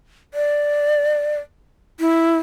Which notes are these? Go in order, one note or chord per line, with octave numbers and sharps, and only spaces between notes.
D5
E4